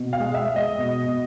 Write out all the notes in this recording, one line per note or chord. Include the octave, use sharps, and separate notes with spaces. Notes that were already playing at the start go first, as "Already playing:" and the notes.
Already playing: B2
F5
G#3
E5
G#3
D#5
B2
B2